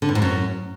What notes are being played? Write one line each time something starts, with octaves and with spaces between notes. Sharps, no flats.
D3
G2
G#2
F#2